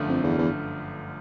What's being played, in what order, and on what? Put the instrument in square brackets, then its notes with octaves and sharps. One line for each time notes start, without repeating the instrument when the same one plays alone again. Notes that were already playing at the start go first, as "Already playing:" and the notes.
Already playing: [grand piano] G1 F#2 D3 F3 A3
[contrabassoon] F2
E2
E2